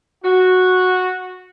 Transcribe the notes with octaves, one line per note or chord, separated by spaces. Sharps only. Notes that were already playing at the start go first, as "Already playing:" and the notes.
F#4